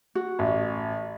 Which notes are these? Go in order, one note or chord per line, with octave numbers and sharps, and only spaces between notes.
F#4
A1